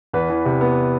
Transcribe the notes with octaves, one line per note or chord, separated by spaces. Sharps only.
E2 B4
E3
C3
B3